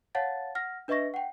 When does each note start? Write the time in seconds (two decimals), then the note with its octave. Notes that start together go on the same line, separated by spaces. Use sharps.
0.15 C#5 F5 F#5 A5 A6
0.55 F#5 F6 A#6
0.88 D4 B4 D#5 E5 C#6 A#6
1.14 F#5 G5